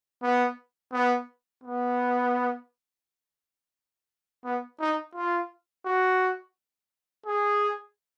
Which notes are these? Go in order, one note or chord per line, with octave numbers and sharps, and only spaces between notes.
B3
B3
B3
B3
D#4
F4
F#4
G#4